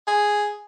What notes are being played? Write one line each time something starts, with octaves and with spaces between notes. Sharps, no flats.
G#4